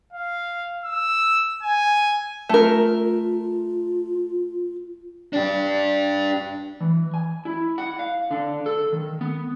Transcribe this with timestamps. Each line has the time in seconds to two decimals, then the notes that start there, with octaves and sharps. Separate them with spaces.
0.13 F5
0.85 E6
1.63 G#5
2.49 A3 F4 A#4
5.33 D4 G4
6.81 E3
7.14 G#5
7.45 E4
7.78 F#5
7.99 F5
8.31 D3
8.66 A4
8.92 D#3
9.21 B3